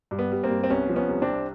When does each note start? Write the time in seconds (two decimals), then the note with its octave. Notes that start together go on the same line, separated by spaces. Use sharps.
0.11 G2
0.19 B3
0.32 G3
0.43 A#3 C4
0.50 G2
0.63 C4
0.70 C2 B3 C#4
0.89 F3
0.96 B3 C#4
1.09 C2
1.22 C4 D4
1.28 C2